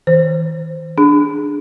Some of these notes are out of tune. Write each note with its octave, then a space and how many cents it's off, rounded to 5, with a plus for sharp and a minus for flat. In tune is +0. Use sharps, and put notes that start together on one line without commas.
E3 -45 C5 -5
D4 +0 G#4 +0